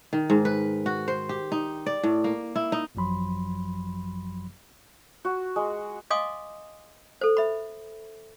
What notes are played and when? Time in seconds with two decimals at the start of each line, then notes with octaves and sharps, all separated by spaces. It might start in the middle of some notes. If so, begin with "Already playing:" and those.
0.13 D#3
0.30 G#2
0.45 B4
0.86 F#4
1.08 C5
1.29 G4
1.52 D#4
1.86 D5
2.03 A2
2.24 A#3
2.56 E4
2.72 D#4
2.95 G#1 F#2 F3 F#3 B5 C6
5.25 F#4
5.56 G#3
6.10 D#5 F5 G#5 C6 D6 D#6
7.21 A4 C5
7.37 E5 B5